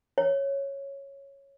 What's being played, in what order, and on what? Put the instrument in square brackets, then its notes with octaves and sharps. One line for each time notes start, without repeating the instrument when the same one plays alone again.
[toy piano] C#5